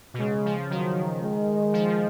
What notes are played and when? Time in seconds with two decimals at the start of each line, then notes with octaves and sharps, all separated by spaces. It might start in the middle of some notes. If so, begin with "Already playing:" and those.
0.14 B2
0.19 C#3 G#3
0.45 F3
0.70 D#3 F#3
1.22 G#3
1.73 F3